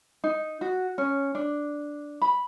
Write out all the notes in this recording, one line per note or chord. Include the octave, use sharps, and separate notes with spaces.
D#4
F#4
C#4
D4
B5